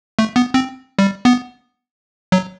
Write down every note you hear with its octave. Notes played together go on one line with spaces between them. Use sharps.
A3
B3
C4
G3
B3
F#3